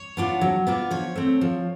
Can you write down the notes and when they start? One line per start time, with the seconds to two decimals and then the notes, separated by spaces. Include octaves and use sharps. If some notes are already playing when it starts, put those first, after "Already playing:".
Already playing: C#5
0.17 B3 D4 F4
0.41 F#3
0.67 B3 D4 F4
0.91 F3 C#5
1.16 A3 C4
1.41 F3